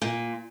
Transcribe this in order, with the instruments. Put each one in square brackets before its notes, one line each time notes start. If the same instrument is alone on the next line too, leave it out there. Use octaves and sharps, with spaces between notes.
[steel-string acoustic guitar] A#2